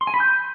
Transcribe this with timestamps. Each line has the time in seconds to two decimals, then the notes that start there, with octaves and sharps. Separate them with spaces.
0.01 C6
0.07 G#5
0.14 B5
0.20 G6